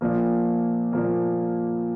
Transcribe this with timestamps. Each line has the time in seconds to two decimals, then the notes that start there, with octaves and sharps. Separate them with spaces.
0.01 A#2 F3 A#3
0.93 A#2 F3 A#3